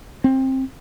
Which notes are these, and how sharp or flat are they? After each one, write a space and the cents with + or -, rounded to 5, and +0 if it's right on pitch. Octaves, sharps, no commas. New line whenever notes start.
C4 +20